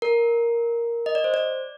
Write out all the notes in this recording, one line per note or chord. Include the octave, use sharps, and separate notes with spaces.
A#4
D#5
D5
C5
D5